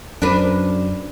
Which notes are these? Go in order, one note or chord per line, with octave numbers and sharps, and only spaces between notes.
F#2 D4 A#4 B4